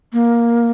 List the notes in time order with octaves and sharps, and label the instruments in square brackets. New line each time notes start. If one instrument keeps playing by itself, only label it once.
[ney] A#3